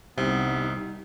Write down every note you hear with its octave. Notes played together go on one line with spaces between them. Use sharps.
C2 C3 G3 B3 D#4